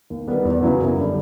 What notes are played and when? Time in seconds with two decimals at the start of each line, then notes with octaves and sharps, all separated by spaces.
0.10 D#2
0.28 D#3 G3 B3
0.45 E2
0.63 C#3 F#3 B3 E4
0.80 F#2
0.97 D3 G3